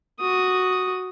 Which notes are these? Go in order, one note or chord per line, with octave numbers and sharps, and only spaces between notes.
F#4 D#6